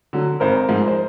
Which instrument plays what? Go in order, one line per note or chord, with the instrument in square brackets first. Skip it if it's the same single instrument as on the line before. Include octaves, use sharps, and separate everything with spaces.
[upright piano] D3 F#3
[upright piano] G#1 [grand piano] A#4 C5
[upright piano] G#2 F3 G#3
[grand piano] C5